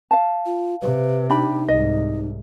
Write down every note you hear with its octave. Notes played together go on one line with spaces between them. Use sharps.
F5 A5
F4
C3 B4
D4 D#4 G4 B5
C2 G#2 D#5